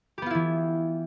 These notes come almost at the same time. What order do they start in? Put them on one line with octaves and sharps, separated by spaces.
G4 B3 F4 E4 E3